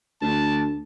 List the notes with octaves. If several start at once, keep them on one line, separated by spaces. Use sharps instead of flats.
D2 A5